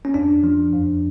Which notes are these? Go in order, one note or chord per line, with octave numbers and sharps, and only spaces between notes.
C#4
F2 D4
F3
F2